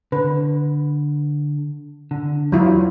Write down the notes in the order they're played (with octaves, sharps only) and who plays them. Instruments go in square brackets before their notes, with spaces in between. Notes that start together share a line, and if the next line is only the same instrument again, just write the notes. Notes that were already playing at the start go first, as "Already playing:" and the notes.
[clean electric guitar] D3 [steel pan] B4
[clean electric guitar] D3
[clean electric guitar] E2 [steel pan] F#3 E4 F4